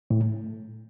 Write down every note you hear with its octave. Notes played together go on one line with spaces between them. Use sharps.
A2